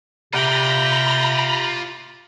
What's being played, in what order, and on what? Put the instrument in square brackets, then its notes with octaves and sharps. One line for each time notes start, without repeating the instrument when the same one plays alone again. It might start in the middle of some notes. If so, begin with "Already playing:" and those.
[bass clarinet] C3 [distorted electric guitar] F4 D5 [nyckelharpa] G5 [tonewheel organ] A#5 B5